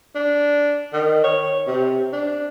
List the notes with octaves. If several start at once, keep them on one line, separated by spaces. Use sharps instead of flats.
D4
D#3
C#5
C3
D4